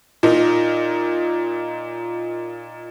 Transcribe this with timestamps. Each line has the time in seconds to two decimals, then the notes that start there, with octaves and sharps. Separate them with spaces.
0.23 A#2 D#4 A#4